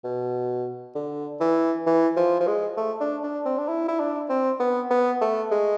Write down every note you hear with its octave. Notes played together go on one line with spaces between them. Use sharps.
B2
D3
E3
E3
F3
F3
G#3
A3
D4
D4
C4
D4
E4
E4
D4
C4
B3
B3
A3
G#3